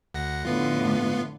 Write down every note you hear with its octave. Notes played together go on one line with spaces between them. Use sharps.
D2 F#5 A#6
F2 A2 D3 B3 F4